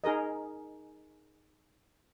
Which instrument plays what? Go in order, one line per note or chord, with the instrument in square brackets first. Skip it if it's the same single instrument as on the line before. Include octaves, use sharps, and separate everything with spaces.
[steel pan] D#4 G#4 A#4 D#5